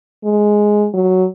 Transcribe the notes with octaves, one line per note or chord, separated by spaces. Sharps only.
G#3
F#3